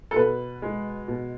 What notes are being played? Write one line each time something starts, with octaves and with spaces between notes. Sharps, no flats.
A4
B2 B4
G#3
B2